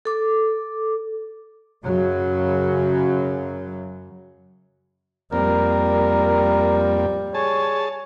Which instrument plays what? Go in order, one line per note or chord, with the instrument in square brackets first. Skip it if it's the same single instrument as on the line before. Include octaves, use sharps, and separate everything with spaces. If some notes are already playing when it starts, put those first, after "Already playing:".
[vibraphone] A4 D6
[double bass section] F#2 C#3 F#3
[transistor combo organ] F2 A#3 C4 [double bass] G3 [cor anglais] A#4
[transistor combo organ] G#4 A5 [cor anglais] C#5